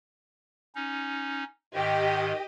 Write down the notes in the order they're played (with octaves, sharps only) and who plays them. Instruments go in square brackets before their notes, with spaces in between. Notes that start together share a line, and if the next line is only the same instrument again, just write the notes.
[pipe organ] C#4 D#4
[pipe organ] G#2 D#3 [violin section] G4 D#5